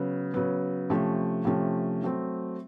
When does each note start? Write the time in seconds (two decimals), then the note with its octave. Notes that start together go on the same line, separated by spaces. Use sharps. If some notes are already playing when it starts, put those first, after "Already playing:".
Already playing: C#3 F#3 B3
0.34 C#3 F#3 B3
0.90 C3 F3 A3 C#4
1.45 C3 F3 A3 C#4
2.02 F#3 A3 C4